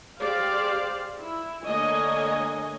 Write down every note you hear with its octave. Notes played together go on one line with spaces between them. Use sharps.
G4 G#4 C5 D5 F5
E4
D3 A3 A#3 C#5 D#5 G#5